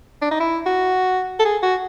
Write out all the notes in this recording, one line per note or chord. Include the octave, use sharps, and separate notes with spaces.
D4
D#4
E4
F#4
A4
G#4
F#4